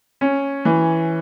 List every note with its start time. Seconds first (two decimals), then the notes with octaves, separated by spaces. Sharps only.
0.21 C#4
0.65 E3